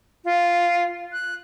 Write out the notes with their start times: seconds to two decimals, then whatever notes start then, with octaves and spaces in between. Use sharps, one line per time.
0.25 F4
1.13 F#6